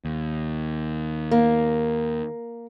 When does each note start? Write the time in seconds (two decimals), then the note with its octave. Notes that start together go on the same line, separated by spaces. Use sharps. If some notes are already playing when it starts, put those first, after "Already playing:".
0.05 D#2
1.31 A#3